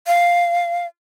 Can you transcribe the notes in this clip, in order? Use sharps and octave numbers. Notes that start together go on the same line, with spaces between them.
F5